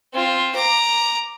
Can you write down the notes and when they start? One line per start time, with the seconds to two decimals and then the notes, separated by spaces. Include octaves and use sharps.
0.14 C4 F4
0.55 A#5 D6